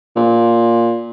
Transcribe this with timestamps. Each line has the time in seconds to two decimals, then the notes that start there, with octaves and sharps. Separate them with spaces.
0.16 A#2